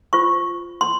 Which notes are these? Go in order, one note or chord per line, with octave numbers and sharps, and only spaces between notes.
F4 C5 C#6
C6